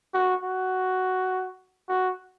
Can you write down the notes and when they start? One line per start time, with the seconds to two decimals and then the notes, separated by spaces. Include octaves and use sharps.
0.14 F#4
0.43 F#4
1.89 F#4